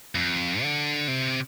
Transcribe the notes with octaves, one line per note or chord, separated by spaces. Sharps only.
F2
D3
C3